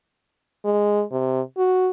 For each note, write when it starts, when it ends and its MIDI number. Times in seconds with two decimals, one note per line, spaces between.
0.64 1.03 56
1.11 1.41 48
1.57 1.91 66